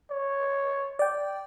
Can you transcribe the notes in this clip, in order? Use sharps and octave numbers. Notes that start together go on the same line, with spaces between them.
C#5
D5 G5